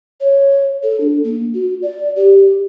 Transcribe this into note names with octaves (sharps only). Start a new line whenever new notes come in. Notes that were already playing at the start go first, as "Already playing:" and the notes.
C#5
A4
D4
A#3
F#4
D5
G4